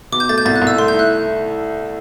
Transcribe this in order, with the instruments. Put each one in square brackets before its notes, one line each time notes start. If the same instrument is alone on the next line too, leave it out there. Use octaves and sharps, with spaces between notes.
[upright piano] B2 [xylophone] D6
[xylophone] G6
[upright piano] A3 [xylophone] A6
[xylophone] G6
[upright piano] C2 [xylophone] A6
[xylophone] F#6
[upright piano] C2
[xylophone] E6
[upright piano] A3 [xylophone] C6
[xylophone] G6
[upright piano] E4 [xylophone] F#6